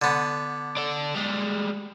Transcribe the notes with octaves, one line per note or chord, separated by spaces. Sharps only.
D3 B3
D4 A4
G3 G#3